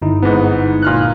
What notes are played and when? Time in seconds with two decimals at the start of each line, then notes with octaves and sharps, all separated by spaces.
0.02 G1 D#4 E4
0.22 G#2 B3
0.82 A#2 F6 F#6